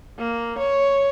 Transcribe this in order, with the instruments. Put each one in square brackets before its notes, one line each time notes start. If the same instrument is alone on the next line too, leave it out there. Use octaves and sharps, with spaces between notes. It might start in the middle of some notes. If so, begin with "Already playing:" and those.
[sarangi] A#3
C#5